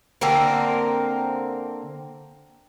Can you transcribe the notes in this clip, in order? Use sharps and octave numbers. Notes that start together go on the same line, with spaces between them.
D3 A#3 C4 A#4